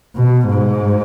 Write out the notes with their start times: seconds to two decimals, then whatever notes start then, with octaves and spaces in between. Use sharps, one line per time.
0.16 B2
0.49 G#2